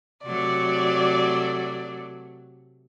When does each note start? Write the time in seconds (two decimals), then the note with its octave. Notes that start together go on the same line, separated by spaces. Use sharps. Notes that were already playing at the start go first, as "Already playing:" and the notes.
0.25 C3 F#3 A3 D5